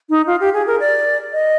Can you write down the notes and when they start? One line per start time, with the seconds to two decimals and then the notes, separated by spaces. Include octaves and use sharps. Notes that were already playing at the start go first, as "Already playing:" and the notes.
0.10 D#4
0.27 F4
0.40 G4
0.53 G#4
0.67 A#4
0.80 D5
1.33 D#5